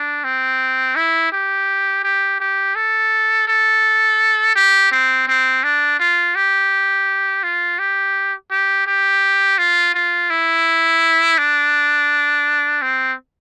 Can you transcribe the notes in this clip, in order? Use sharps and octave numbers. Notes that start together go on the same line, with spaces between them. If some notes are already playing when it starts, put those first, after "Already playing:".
Already playing: D4
C4
E4
G4
G4
G4
A4
A4
G4
C4
C4
D4
F4
G4
F4
G4
G4
G4
F4
F4
E4
D4
C4